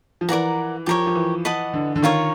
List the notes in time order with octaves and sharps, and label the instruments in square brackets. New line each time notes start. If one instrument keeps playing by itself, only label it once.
[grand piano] F3
[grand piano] E3 [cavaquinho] A#4 D5 F#5 A#5
[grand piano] F3 [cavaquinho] G4 A#4 C#5
[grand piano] F3
E3
[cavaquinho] B4 D#5 F#5 A5
[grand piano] D3
D3
[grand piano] D#3 [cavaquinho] F4 A#4 C#5